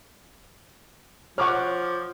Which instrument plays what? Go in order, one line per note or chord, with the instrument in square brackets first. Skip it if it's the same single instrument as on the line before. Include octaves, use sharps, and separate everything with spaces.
[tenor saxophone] F3 [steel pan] C#5 F#5 [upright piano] C#6 D6 F6